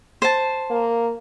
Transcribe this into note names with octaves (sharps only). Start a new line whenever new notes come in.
C5 A5
A#3